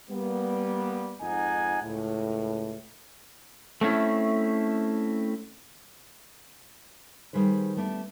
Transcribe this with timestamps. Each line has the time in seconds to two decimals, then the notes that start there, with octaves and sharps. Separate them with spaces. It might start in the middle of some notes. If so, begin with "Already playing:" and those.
0.10 G3 A#3 B3
1.21 F2 G#2 D#4 F#5 G#5
1.83 C#2 A2
3.81 A3 C4 C#4 E4
7.33 D#3 E3 G3 G#4 B4 C5
7.77 G3 A3 B3 D4